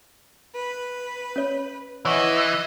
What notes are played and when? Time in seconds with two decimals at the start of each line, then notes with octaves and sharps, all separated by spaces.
0.55 B4
1.36 C#4 C#5
2.05 E3 C#5 D#5 E5 F#5 C#6